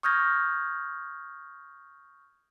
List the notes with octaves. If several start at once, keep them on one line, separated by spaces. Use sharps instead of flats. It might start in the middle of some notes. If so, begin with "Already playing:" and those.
C#6 D#6 F6 G6 G#6 A#6